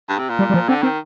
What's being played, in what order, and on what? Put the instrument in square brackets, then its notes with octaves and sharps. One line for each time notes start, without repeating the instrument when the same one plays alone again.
[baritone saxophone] G2
C3
A#2
[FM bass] G3
G3
F3
[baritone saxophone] D3 [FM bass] C4
[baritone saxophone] D#3 [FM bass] C4